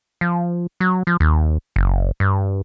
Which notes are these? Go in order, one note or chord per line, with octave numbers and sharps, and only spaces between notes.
F3
F#3
F3
D#2
F#1
G2